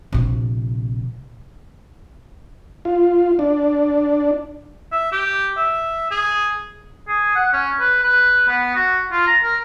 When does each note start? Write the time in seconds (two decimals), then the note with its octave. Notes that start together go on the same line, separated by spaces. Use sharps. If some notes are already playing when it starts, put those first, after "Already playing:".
0.13 A#1 C3
2.85 F4
3.39 D4
4.92 E5
5.12 G4
5.57 E5
6.11 G#4
7.08 G#4
7.35 F#5
7.53 C#4
7.80 B4
8.03 B4
8.49 B3
8.75 F#4
9.12 F4
9.27 A#5
9.44 A#4